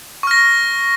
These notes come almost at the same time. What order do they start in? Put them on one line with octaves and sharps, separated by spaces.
C#6 F6 A#6